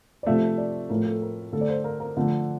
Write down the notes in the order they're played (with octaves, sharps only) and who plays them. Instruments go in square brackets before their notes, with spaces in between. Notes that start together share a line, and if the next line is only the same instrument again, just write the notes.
[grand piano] D5
C3 F3 A3 E5
D5
A2 F3 A3 A#4
A4
A#4
D3 A3 A4
D5
C5
A#4
A#4
D3 F3 A3